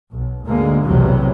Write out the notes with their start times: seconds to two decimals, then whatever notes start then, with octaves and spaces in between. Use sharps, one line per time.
0.13 B1
0.46 D2 G#2 D3 G#3 A#3
0.85 B1 E2 A2 C3 F#3 G3